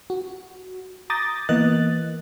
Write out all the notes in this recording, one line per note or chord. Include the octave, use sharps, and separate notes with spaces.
F#4
A#5 D6 D#6 G6 A6 A#6
E3 A#3 B3 D#5 F#6 A6